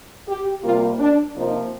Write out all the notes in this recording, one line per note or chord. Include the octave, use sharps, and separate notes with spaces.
G4
C3 G3 A#3 F4
D4
C3 F3 A#3 D#4